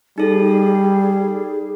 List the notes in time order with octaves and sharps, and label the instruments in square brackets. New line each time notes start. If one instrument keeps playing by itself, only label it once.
[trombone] G3 [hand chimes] D#4 A4 [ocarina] G#4